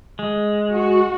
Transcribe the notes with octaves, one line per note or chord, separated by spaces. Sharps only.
G#3
F#4